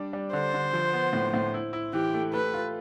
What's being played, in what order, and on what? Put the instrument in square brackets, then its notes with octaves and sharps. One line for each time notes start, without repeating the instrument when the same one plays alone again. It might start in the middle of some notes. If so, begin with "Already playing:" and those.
Already playing: [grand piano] G3 D4
G3
[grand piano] D3 [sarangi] C5
[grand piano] D3
F3
B3
A2
A2
E4
E4
[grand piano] E3 [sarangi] G4
[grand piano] A3
[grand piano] A3 [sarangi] B4
[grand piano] F4